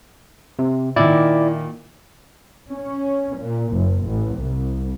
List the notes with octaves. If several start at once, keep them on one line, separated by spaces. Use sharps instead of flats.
C3
A#2 D#3 E4 D5
C#4
A#2
F#1
A1
C2